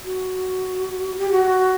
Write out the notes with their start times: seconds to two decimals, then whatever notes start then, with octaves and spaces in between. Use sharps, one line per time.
0.05 F#4
1.18 G4
1.31 F#4